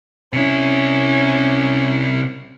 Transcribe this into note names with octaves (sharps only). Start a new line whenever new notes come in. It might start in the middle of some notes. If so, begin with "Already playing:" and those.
C3 C#4 E4